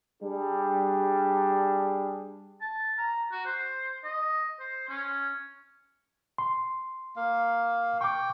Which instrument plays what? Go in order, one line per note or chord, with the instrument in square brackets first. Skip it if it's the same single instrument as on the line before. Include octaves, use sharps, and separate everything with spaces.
[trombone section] G3 D4 G#4
[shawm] A5
A#5
F#4
C5
D#5
C5
C#4
[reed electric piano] C6
[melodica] A#3 F5
[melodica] G5 [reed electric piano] C#6 D6